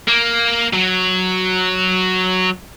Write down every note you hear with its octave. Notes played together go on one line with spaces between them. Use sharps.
A#3
F#3